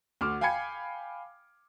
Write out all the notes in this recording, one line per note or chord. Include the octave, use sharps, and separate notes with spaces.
D2 F#4 D6 F6
F5 G5 G#5 B5 G#6 C#7